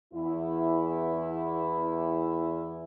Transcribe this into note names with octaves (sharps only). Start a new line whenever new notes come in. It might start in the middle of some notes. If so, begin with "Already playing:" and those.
E2 E4